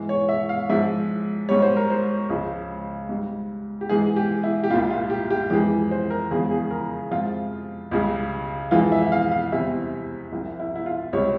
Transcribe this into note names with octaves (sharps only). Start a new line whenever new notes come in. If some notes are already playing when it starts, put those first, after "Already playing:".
Already playing: G#2 E3 G#3
C#5
E5
F5
G#2 F3 G#3 E5
G#2 G3 C#5
C5
A#4
C5
C#2 C#3 F3
G#2 G3
G4
G#2 E3 G#3 G#4
G4
E4
G4
C2 A#2 G3 F4
F4
G4
G4
F2 E3 G#3 G4
C5
A#4
E2 C#3 F3 G#3 G#4
G#4
A#4
F2 C3 F3 G#3 F4
C#2 C#3 G3
F2 E3 G#3 F4
E5
E5
F5
F5
E2 C3 G3 E5
C2 C3 F3
E4
E4
F4
C#2 C3 G3 C#5